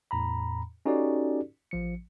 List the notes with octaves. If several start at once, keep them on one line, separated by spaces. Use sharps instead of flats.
E2 A2 A#5 B5
C#4 D#4 F#4 G4 A4 D5
A1 F3 C#7